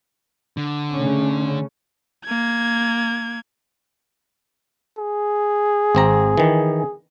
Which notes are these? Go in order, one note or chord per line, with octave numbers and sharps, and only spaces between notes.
D3
C#3 A3 C#4
A#3 G#6
G#4
G#1 C4 A#5
D#3 E3